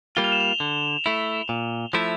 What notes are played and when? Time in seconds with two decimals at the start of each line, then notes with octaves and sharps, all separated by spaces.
0.16 G3 A#3 F4 G7
0.24 F7
0.32 E7
0.40 F7
0.60 D3
1.06 A3 E4
1.49 A#2
1.93 F3 A3 E4